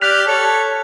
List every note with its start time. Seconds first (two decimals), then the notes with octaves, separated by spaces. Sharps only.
0.01 G4 D5 F6 F#6 B6 F7
0.27 A4 C#5